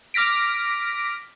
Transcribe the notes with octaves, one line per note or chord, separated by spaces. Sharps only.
D6 F6 A#6 B6 D7